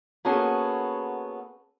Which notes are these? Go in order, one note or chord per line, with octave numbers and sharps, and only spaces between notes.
A#3 B3 C#4 F#4 G#4 A4